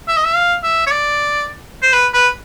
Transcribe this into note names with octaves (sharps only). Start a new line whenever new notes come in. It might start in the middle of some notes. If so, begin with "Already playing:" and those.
E5
D#5
E5
F5
E5
C#5
D5
C5
B4
B4